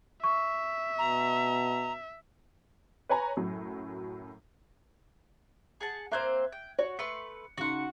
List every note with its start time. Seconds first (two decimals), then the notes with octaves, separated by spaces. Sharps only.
0.24 E5 C#6
0.98 B2 A#5
3.09 B4 C#5 G#5 A#5
3.37 F#2 A2 F#3
5.81 G#4 F#5 A5
6.12 A#3 C4 C5 E5 F#6 G#6
6.52 G5
6.79 F#4 C#5
6.99 A3 B4 C6 C#7
7.58 C#3 D#4 F#4 F#5 C6